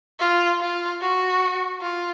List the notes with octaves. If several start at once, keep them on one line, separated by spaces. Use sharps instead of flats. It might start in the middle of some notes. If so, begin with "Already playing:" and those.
F4
F4
F#4
F4